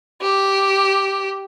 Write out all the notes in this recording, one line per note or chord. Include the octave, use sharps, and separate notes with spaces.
G4